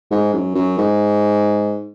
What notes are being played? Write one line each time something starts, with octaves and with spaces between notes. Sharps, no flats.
G#2
F#2
F#2
G#2